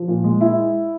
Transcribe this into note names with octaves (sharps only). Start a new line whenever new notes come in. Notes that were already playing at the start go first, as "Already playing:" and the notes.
Already playing: F3
A#2
G#3
E4